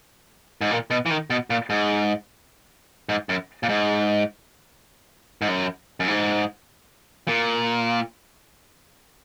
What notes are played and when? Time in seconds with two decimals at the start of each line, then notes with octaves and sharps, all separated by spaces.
0.61 G#2
0.71 A#2
0.90 B2
1.06 E3
1.10 D#3
1.30 B2
1.50 A#2
1.70 G#2
3.09 G#2
3.29 F#2
3.63 A#2
3.69 G#2
5.42 G#2
5.48 F#2
6.00 F#2
6.08 G#2
7.28 A#2